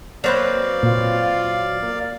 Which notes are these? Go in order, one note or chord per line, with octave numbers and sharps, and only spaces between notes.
F#3 A#3 C4 B4 D5 F5
A#2 F4
A#3